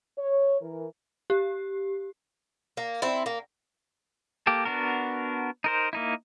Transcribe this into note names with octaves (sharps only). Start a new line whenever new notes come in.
C#5
E3 A#4
G4
A#3
C4 E4
A#3
A#3 G4 A4
B3 D4 F#4 A#4
D#4 A#4 C5
A#3 D#4 E4